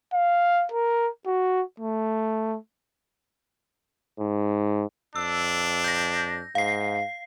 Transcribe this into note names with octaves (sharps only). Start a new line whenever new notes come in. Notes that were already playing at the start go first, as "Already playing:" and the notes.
F5
A#4
F#4
A3
G#2
F2 D4 E6
G6 A#6
G#2 F5 C7